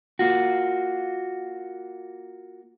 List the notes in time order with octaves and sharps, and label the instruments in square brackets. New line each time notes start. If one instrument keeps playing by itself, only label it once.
[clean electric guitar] A#3 F4 F#4